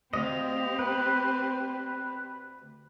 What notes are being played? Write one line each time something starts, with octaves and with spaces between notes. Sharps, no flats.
D2 C4 G4 D#5 F5
B4